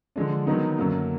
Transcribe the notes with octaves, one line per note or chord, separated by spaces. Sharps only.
D3 F3 G#3 D4
D#3 F#3 B3 D#4
F#2 D3 F#3 A#3